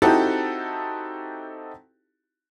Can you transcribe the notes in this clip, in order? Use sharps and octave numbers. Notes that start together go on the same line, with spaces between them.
C4 D#4 E4 F#4 G4 A4